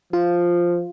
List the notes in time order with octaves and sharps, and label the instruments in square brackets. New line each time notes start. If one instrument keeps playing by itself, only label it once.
[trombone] F3 [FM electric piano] F4